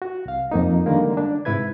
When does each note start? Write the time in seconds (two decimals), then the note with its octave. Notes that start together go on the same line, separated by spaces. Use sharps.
0.02 F#4
0.25 C2 F5
0.51 F2 A#3 D#4
0.86 D3 D#3 G3 G#3 A#3
1.17 D4
1.45 G#2 C3 E4 B4 G#6